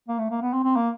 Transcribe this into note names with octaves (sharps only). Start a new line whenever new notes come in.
A#3
A3
A#3
B3
C4
C4
A#3